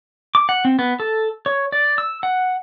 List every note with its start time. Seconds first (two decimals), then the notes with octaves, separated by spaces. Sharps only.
0.35 D6
0.49 F#5
0.65 C4
0.79 B3
1.00 A4
1.46 C#5
1.72 D5
1.98 E6
2.23 F#5